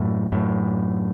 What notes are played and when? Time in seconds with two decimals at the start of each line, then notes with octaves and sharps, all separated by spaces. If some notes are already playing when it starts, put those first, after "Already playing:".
Already playing: F#2 A2
0.32 F#2 A2